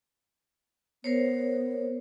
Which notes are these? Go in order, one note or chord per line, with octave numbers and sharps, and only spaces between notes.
B3 A#4 C5 C#5